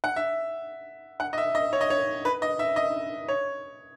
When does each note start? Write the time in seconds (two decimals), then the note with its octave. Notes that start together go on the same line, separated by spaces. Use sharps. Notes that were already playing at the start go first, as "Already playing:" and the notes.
0.04 F#5
0.16 E5
1.20 F#5
1.33 D#5
1.38 E5
1.55 D#5
1.73 C#5
1.81 D#5
1.90 C#5
2.25 B4
2.42 D#5
2.59 E5
2.76 D#5
3.28 C#5